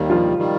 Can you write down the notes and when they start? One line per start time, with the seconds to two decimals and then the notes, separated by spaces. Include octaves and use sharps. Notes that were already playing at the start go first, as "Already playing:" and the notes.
Already playing: D#2 D#3 G3
0.10 F3 F4
0.38 D#3 G3